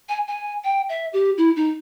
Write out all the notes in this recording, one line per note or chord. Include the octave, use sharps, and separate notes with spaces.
G#5
G#5
G5
E5
G4
E4
D#4